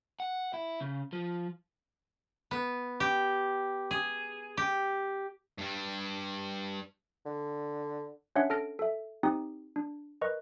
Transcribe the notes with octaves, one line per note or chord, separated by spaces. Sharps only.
F#5
E4
C#3
F3
B3
G4
G#4
G4
G2 G3
D3
C#4 D4 C#5 E5 F#5
A4 A5 F6 A#6 D7
A4 E5
C4 D#4 G4 D#6
D4
A#4 B4 D#5 C#6